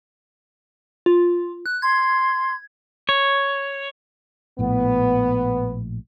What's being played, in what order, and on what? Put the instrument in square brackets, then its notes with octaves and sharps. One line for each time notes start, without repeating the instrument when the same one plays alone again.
[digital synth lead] F4
F#6
[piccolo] C6 [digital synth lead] G#6
[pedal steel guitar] C#5
[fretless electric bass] A#1 A2 [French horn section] B3